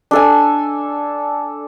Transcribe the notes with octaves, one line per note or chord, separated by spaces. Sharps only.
D4 A4 G#5